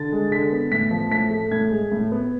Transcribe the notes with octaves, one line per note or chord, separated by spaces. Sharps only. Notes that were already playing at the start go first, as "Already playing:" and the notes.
Already playing: D3 A6
G#3
D3 B6
B3
A2 B6
F3
A2 B6
A3
A2 G#6
G#3
A2
B3